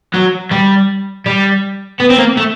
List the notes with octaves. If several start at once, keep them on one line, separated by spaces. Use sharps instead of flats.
F#3
G3
G3
B3
C4
A#3
A3